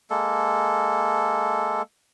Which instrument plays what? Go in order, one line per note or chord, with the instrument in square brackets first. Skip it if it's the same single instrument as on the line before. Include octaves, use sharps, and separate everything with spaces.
[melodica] G#3 A#3 A4